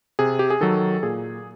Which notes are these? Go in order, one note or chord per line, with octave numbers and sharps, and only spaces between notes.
C3 G#4
G4
G#4
D#3 F#3 A4
A#2 G#4